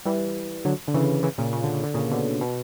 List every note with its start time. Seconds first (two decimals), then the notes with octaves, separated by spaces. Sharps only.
0.05 E3 G3
0.65 D3 F#3
0.88 D3
0.94 C#3 E3
1.23 C#3 E3
1.38 A#2 C#3
1.53 C#3
1.64 D3
1.74 C#3
1.84 D3
1.94 A#2 C#3
2.11 B2 D3
2.41 B2